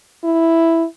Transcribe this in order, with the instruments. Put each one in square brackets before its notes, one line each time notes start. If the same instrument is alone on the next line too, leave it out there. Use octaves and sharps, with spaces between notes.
[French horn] E4